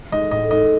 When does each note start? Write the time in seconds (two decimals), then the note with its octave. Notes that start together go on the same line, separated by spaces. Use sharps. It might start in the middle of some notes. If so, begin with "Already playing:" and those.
0.12 G#3 D#4 D#5
0.31 A2 D#5
0.51 G#3 D#4 D#5